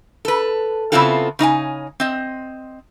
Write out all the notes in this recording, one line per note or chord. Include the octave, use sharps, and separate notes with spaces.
A4 B4
C#3 B3 C4 E4 F4 A4
C#3 D#4 D#5 G#5
C4 D#5